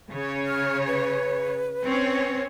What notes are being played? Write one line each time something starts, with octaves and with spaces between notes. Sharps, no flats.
C#3 C#5
F6
B4
C4 C#4 C#5